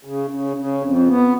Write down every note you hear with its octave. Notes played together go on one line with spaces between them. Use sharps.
C#3
C#3
C#3
F2
B3